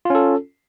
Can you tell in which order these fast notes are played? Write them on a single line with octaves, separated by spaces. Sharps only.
F4 C#4 A4